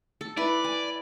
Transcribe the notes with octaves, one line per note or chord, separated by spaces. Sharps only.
A4
E4 B4 D5
G#5